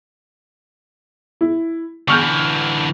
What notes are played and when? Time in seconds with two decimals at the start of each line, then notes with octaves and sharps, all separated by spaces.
1.41 E4
2.08 D3 E3 C#6 F6 G6